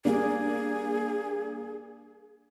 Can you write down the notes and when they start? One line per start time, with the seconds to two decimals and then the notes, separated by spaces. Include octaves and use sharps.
0.05 G3 A#3 D4 G#4